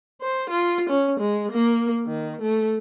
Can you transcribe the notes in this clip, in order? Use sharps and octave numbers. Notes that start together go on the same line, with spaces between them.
C5
F4
C#4
G#3
A#3
D#3
A3